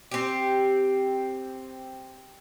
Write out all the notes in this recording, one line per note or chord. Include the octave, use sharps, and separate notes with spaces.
C4 G4